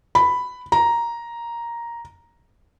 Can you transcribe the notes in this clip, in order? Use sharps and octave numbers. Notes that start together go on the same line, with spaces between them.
B5
A#5